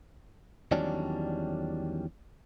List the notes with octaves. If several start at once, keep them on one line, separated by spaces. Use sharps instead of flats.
E2 D#3 F#3 G3 C#4 D4